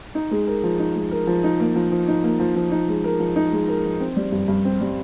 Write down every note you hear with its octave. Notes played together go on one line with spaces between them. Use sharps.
D#4
G#3
A#4
F3
D#4
G#3
A#4
F3
D#4
A#3
F3
F3
D#4
A#3
F3
F3
D#4
G#3
A#4
F3
D#4
G#3
A#4
F3
C4
G3
G2
G2
C4
G3